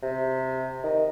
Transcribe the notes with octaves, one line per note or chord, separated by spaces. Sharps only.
C3
D#3